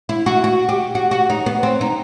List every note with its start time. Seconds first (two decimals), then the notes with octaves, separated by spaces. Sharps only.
0.09 E4
0.26 F#4
0.44 F#4
0.69 G4
0.95 F#4
1.11 F#4
1.30 D#4
1.46 B3
1.63 C4
1.81 D#4